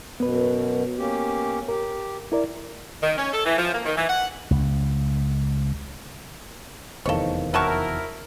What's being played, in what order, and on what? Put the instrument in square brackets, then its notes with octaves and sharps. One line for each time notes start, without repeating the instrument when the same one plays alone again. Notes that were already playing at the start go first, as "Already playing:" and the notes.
[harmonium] F#2 B2 [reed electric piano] B3 B4
[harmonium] A#3 C#4 G4
[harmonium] G4 [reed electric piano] A#4
[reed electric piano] E4 A#4 D5
[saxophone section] D#3
C#4
A4
E3
F3
A#3
D#3
E3
F#5
[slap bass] C#2
[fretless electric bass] F1 E2 D#3 [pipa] A4 C#5 [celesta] C5 D#5 F5
[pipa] F#3 A5 C#6 [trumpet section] E4 A#4